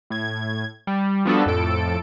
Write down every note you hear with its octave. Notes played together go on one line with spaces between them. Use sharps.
A2 G#6
G3
F3 G3 B3 D4 F#4 A4
F2 A2 A4 D7